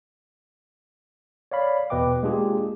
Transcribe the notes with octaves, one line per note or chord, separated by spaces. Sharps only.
C#5 D5 F5 B5
E2 B2 B4 D#5 G5 D6
G#3 A#3 D4 F4 G4 G#4